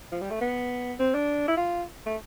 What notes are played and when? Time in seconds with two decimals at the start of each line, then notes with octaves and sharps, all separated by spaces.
0.12 F3
0.21 G3
0.30 A3
0.41 B3
0.99 C4
1.14 D4
1.48 E4
1.57 F4
2.06 A3